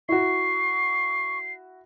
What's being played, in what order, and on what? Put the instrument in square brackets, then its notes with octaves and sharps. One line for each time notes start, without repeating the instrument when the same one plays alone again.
[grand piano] E4 F#4 [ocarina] C#6 [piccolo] C7